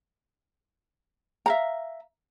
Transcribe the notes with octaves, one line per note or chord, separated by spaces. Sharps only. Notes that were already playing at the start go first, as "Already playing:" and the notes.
E5 F5 A#5